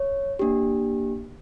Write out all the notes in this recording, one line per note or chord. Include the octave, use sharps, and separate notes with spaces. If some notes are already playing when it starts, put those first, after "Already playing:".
Already playing: C#5
A#3 D4 G4